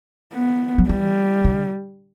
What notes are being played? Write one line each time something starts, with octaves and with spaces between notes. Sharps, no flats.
B3
F#3
E3 G3
D3